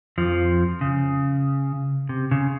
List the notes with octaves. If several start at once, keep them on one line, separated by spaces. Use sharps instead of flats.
F2 F3
C#3
C3
C#3